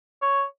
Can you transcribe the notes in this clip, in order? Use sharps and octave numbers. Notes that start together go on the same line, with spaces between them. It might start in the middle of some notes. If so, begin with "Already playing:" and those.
C#5